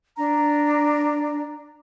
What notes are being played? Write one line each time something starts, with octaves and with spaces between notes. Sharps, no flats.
D4 A#5